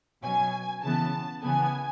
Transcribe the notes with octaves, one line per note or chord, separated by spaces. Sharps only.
B2 F#3 C#4 G#5
C#3 E3 B3 A5
C#3 E3 B3 G#5